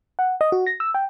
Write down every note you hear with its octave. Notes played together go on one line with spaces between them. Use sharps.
F#5
D#5
F#4
A#6
E6
G5